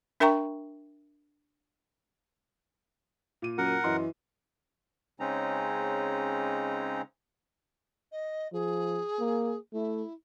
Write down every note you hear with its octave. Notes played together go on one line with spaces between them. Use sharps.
D4 A#4 E5 G5 A#5 C#6
A#2 D#7
F#2 A#4 F#5
F#2 E3 D#5 C6
C#3 G#3 C4 C#4 D#4 A#5
D#5
F3 G#4
A#3
A3 E4